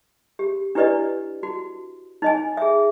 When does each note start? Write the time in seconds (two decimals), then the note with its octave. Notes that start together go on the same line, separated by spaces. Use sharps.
0.39 G4
0.75 D4 E4 G4 B4 D5 D#5
1.43 F#4
2.22 D#4 D#5 G#5
2.57 G#4 E5